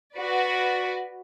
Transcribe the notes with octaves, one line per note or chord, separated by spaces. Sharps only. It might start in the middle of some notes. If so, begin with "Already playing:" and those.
F#4 B4 D5